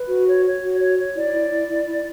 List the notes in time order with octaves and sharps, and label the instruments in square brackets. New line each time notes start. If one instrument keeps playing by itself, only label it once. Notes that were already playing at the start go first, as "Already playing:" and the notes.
Already playing: [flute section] B4
F#4
C#5
C#5
F#4
C#5
C#5
E4 D5
E4
E4
E4
E4